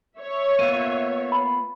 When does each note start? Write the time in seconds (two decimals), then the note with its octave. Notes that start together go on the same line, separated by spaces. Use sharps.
0.17 C#5 E5
0.59 A#3 B3 F4 D#7
1.32 B5